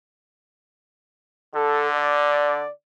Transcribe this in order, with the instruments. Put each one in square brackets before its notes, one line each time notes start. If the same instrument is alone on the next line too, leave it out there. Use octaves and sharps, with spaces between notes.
[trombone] D3 [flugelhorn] A4
[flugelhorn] D5